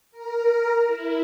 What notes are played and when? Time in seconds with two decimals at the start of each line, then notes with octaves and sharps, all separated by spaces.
0.11 A#4
0.87 E4